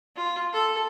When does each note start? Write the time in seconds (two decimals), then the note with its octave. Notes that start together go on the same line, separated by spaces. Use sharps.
0.16 F4
0.53 A4